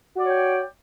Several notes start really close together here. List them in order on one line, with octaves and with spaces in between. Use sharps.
F#4 D5 C#5 G5